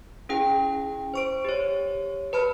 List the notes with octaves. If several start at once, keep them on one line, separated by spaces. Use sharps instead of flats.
C#4 E4 G#4 G5
C5 C#6 D7
G4 C#5
B4 A5 B5 F6